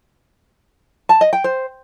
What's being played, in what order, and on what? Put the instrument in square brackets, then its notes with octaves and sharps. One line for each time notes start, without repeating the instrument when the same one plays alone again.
[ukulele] A5
D#5
G5
C5